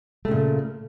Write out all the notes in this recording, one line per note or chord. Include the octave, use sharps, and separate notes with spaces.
A#2 C#3 A3